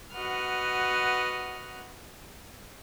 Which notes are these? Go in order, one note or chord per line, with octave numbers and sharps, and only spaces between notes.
F#4 B4 D#5 F#5 F6